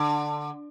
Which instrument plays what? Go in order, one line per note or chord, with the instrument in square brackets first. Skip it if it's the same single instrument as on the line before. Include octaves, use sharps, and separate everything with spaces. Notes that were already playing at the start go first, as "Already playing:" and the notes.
Already playing: [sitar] D3